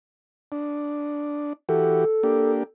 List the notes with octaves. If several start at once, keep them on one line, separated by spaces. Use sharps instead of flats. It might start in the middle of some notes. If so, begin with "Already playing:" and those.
D4
E3 F#4 G4 A4
A#3 D4 G4